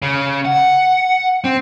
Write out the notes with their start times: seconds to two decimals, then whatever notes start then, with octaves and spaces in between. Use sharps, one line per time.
0.02 C#3
0.45 F#5
1.45 C4